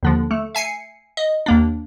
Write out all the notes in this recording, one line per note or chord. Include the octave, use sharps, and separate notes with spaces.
D#2 D3 F3
A3
E5 G#5 C7 C#7
D#5
D#2 A#3 D4